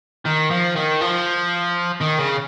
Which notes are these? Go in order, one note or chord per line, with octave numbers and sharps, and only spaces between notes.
D#3
F3
D#3
F3
D#3
C#3